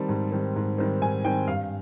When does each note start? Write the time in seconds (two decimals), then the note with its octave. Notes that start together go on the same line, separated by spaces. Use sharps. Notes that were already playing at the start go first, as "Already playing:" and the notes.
Already playing: D#3 G3 C4 A5
0.09 G#2
0.32 D#3 G3 C4
0.56 G#2
0.78 D#3 G3 C4
1.02 G#2 G#5
1.24 D#3 G3 C4 G5
1.48 G2 F5